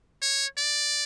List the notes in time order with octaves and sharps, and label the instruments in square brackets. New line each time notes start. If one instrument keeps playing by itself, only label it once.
[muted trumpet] C#5
D5